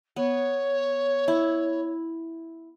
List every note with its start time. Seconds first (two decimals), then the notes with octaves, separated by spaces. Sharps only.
0.16 B3 C#5
1.28 E4